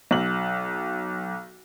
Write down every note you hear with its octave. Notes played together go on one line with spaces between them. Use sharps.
B1 F#7